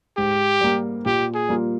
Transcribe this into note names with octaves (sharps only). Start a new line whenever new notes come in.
G#2 G4
G3 A#3
A#2 G4
G#4
G3 A#3 F4